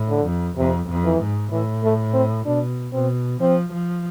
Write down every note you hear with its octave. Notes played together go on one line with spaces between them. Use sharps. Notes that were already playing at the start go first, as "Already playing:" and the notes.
Already playing: A2
D3
F2
F2 C3
F2
E3
G#2
A2 E3
A3
C4
B2 D4
B2 C4
F3 C4
F3